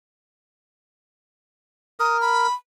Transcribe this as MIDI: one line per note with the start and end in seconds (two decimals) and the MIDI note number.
2.00 2.47 70
2.00 2.20 87
2.21 2.53 83